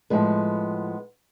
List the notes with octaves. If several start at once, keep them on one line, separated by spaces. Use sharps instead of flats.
A2 F3 G#3 B3